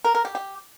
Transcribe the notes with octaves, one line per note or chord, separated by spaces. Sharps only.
A#4
A#4
G4
G4